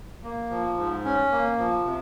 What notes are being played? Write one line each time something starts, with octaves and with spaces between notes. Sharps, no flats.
A#3
F3
G#2
C#4
A#3
F3
C3